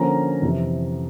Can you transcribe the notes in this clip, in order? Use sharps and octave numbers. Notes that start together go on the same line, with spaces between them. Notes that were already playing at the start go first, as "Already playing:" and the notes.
Already playing: D3 F3 A#3 C#4 A#5
F2 C3 E3